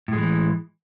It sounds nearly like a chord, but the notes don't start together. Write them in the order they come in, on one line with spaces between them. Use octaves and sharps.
A2 G#3 E3